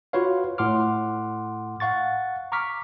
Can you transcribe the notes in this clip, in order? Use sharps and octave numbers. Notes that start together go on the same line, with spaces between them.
F4 F#4 B4 C#5 F5
A2 F#5 C6 D6 F6
F5 F#5 C#6 A6
A#5 C#6 D6 F6 B6